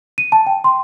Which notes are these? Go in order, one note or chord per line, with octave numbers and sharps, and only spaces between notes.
D#7
A5
G5
C6